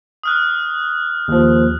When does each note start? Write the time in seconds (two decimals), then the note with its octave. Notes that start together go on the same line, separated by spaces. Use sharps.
0.23 D#6 F6 F#6
1.28 D#2 F3